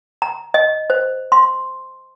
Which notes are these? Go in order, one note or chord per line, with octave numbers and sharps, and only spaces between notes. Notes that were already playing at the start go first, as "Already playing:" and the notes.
A#5
D#5
C5
C6